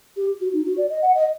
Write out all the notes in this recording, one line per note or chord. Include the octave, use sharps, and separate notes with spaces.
G4
F#4
D#4
F#4
D5
D#5
F#5
D#5